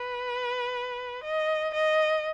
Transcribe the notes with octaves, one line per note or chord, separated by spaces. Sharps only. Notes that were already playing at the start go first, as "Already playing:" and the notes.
Already playing: B4
D#5
D#5